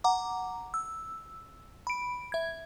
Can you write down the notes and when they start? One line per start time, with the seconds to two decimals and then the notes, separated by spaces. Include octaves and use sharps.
0.04 F#5 A#5 D6
0.74 E6
1.87 B5 D7
2.32 E5 G#6